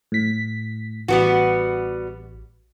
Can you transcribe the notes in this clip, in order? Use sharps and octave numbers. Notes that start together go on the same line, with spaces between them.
A2 B6
A1 G3 B3 F#4